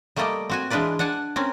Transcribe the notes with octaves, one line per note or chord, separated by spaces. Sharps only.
G3 A3 A#3 G4 D5 D#5
C4 F#4 G#5
E3 G#3 D4 F4 B4 D5
D4 F#5 G#5 A5
C4 C#4 A#4